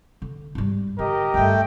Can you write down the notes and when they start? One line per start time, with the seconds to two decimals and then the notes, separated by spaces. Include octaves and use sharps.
0.22 D3
0.55 G#2 G3
0.99 D3 G4 A#4 D#5
1.34 G2 D#3 A3 G5